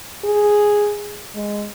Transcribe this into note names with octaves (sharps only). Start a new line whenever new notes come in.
G#4
G#3